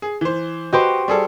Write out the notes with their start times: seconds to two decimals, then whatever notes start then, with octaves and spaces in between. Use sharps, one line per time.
0.02 G#4
0.21 E3 C5
0.73 F#4 G4 B4 C5 D#5
1.08 G3 G#4 A4